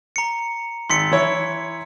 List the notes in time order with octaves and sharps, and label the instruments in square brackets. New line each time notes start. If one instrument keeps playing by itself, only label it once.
[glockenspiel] A#5 C#7
[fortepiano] G#1 [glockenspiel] C6 B6 C#7
[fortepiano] E3 E4 C#5